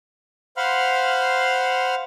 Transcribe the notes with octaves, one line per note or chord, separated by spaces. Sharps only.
C5 F5 F#5 B5 C6 F6